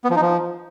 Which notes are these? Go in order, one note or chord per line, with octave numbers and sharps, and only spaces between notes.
B3
F3
D#4
F3